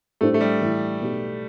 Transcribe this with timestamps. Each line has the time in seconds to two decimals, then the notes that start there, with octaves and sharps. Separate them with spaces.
0.21 A2 G3 A3 D4 A4 C5
0.34 A3
0.41 G3
0.61 A2 E3 A3
1.00 B1 B2 G3